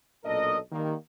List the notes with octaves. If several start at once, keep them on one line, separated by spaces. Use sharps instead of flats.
B1 A#2 D4 A4 A#4 D#5
D#3 G3 A#3